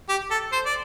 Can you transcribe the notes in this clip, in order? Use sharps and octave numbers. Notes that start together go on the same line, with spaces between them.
G4
A4
C5
D5